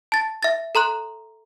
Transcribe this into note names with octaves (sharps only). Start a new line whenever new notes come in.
A5 A6
E5 A6
A4 A#5 C6 F#6